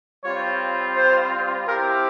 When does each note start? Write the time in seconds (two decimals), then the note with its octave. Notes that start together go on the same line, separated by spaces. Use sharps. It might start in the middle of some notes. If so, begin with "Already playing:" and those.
0.24 G3 C4 F4 C#5
0.96 C5
1.67 C4 E4 G4 A#4